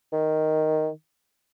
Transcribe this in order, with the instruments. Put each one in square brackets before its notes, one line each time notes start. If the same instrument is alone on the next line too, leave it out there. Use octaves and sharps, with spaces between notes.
[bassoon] D#3